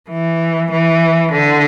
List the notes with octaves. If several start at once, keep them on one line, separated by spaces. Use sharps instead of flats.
E3
E3
D3